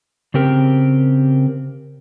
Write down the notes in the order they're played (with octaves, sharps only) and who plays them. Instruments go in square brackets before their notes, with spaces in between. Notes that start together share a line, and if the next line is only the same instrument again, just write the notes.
[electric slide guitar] C#3 C4 G4 A#4